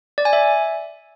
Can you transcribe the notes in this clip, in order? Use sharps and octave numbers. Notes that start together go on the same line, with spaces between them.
D5
G#5
E5